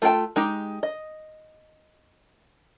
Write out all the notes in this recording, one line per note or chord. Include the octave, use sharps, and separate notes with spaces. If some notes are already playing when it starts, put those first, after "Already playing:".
A3 F4 A#4 G5 A5
G#3 D#4 G4
D#5